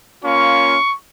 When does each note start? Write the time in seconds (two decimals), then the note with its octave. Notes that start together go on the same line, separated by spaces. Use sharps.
0.24 A#3 C#4 F4 C#6